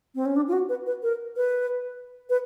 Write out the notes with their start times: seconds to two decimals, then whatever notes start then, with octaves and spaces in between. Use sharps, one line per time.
0.15 C4
0.26 C#4
0.36 D4
0.48 F4
0.53 F#4
0.69 B4
0.86 B4
1.03 A#4
1.36 B4
2.30 B4